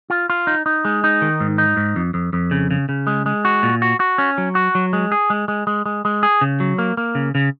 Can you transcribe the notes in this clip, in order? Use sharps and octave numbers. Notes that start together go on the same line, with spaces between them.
F4
F4
D#4
D#4
G#3
D#4
D#3
G#2
D#4
G#2
F2
F2
F2
C#3
C#3
C#3
G#3
G#3
F#4
A#2
F#4
F#4
C#4
F#3
F#4
F#3
G#3
G#4
G#3
G#3
G#3
G#3
G#3
G#4
C#3
F#3
A#3
A#3
C#3
C#3